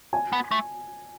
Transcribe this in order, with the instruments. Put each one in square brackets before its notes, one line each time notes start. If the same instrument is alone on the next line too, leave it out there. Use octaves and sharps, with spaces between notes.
[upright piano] G#5
[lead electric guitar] B3
A3